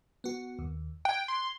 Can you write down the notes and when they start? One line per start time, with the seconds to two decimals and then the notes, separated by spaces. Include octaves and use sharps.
0.24 B3 F#4
0.59 D#2
1.05 G5 F#6 G#6
1.28 C6